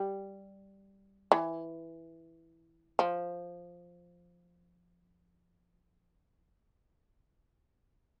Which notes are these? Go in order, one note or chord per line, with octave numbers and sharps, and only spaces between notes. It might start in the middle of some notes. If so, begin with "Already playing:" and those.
Already playing: G3
E3
F3